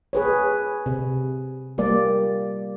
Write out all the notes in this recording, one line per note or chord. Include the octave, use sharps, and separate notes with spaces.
G#4 B4 C#5
C3
G3 A#3 D5